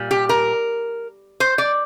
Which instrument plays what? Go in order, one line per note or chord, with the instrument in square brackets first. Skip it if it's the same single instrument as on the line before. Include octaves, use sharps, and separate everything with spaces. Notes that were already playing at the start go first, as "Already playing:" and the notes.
Already playing: [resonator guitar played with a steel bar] A#2 G3
G4
A#4
C5
D5